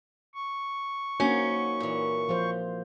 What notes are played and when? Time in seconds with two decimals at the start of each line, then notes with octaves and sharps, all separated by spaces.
0.35 C#6
1.20 A#3 C#4 D#4 F#4 C5
1.80 A#2 E3
2.29 F3 F4 C5